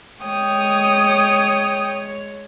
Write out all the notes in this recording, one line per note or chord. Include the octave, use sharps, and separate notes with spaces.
G#3 C#5 G5 D#6